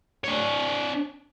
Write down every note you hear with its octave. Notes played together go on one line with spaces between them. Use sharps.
D4 C#5